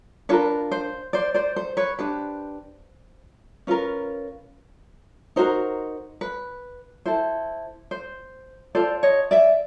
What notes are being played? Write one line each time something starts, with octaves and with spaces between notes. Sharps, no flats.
D4 F4 A#4 B4 C#5
C5
C5 D5
C5 D5
C5
B4 C#5
D4 G4 B4 C5
C#4 F4 A#4 B4
D#4 F#4 A#4 C5
B4
E4 A4 C5
C5
F4 A4 C5 D5
C#5 D#5
D5 E5